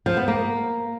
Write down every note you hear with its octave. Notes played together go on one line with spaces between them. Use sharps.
F3
B3
A#3